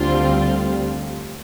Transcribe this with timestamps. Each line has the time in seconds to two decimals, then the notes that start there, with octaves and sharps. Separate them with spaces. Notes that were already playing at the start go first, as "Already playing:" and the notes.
Already playing: D2 D3 G3 C4 F4